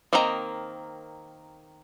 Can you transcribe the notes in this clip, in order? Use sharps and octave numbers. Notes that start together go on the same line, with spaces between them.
D#3 A#3 C4 D#5 A#5